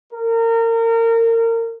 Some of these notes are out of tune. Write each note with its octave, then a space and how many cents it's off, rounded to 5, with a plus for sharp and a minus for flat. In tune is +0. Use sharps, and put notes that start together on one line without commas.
A#4 -30